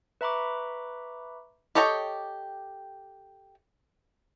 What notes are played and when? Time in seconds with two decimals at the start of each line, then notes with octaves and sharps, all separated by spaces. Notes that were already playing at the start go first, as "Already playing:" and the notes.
0.21 B4 E5 A#5 B5 C#6 D6
1.75 G4 A4 C#5 D#5 G5